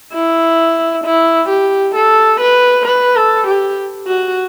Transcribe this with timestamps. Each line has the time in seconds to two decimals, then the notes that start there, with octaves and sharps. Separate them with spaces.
0.13 E4
1.04 E4
1.49 G4
1.95 A4
2.41 B4
2.86 B4
3.16 A4
3.47 G4
4.07 F#4